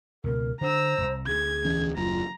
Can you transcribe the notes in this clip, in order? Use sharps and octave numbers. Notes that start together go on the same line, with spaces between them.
C#2 B2 A#4
D3 D4 C5 A#5 E6
D#1 C2
D2 G#4 G#6
E1 E3 C#4
F#1 D#2 F#3 F4 A#5